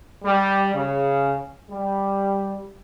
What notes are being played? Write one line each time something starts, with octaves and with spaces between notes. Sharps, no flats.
G3
C#3
G3